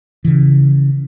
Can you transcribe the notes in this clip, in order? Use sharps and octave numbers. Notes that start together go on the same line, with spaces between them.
C#3 E3